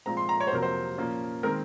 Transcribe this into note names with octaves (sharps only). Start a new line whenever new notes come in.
A#2 F3 G#3 C4 A#5
C6
A#5
C#5
C5
F2 C3 F#3 A#3 A#4
C5
A#2 F3 A#3 C#4
D#3 G#3 C4 A#4